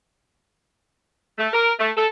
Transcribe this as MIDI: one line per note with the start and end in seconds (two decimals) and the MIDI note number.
1.38 1.48 57
1.53 1.71 70
1.79 1.91 57
1.96 2.07 69